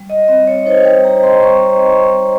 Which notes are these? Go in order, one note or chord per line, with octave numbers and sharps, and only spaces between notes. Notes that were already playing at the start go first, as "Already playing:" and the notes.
Already playing: G3
D#5
C4 D#5
C#5
D#4 C5
G5
G3 A#5
C6
D#4 C#6
D#4
G3